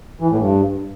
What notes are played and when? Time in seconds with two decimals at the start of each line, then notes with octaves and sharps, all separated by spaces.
0.20 E3
0.29 A2
0.39 G2